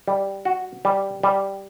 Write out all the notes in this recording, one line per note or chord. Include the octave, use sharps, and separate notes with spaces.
G3
F#4
G3
G3